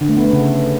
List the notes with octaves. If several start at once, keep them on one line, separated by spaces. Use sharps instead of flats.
D3
A3
B3
A3
C#3